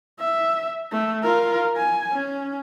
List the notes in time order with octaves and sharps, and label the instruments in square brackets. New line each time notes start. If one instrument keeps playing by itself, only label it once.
[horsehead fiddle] E5
A3
F4 A#4
G#5
C#4